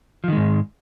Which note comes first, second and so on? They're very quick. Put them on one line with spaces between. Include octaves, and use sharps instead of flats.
F3 D#3 G#3 G#2